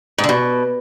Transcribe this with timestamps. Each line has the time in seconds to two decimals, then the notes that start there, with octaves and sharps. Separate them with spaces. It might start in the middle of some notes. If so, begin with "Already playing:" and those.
0.18 G#2
0.24 D3
0.29 B2